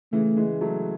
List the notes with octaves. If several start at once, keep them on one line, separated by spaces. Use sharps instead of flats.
C#3 E3 A3
E3 G#3
F#3 A3